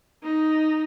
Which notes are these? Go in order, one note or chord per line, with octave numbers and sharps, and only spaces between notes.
D#4